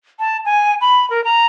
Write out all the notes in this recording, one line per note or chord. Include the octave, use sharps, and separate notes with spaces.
A5
G#5
B5
A#4
A#5